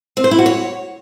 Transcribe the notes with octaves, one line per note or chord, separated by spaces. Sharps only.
C4
C5
E4
F#4
C#5